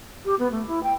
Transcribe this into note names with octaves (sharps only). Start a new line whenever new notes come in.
G4
B3
A3
E4
G5